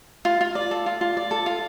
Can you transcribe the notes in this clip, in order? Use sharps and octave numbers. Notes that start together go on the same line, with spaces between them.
F4
F4
D5
A4
F4
F4
D5
A4
F4